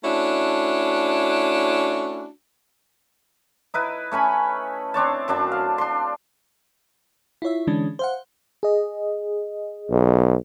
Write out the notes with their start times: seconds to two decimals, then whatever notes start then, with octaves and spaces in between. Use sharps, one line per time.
0.04 A3 C#4 D4 E4 F#4
3.74 D#4 E4 B4
4.12 A3 C#4 G#5 B5
4.94 C4 D4 C#5 A5
5.28 F#2 F#3 D4 A5
5.52 F5
5.78 D4 C6
7.42 E4 F4 C#5 E5
7.67 D3 E3 G#3 C#4 D4
7.99 C5 F5 F#5
8.63 G#4 D#5
9.90 B1